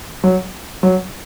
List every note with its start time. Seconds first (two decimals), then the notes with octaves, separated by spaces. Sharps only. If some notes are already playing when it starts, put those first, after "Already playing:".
0.24 F#3
0.83 F#3